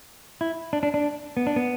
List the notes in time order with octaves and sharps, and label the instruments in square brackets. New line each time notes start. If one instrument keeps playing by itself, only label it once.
[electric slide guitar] E4
D4
D4
D4
B3
D4
B3